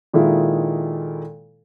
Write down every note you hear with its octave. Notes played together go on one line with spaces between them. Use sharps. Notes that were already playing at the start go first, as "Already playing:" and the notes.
A#2 D#3 G#3 E4 F4 A4